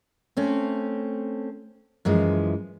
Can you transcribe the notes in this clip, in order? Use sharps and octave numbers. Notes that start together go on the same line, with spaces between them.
A3 C4 C#4
F#2 E3 F3 G#3